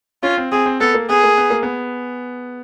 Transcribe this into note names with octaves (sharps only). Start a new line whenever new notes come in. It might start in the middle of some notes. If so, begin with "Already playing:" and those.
C#4 F4
C4
C4 G#4
C4
B3 A4
A#3
B3 G#4
A#3
B3
A#3
B3